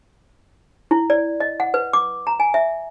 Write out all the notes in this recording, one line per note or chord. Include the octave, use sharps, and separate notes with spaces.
E4
D5
D#5
F#5
B4
D6
A#5
G#5
E5